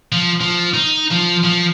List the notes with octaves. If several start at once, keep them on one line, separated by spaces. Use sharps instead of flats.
F3
F3
D#4
F3
F3